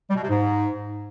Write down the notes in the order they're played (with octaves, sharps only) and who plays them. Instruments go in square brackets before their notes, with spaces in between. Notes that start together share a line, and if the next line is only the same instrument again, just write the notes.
[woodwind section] G3
B2
C3
G#2